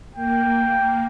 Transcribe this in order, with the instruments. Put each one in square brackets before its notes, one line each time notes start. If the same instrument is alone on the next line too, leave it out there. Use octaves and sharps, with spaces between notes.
[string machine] A#3 [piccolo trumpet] G5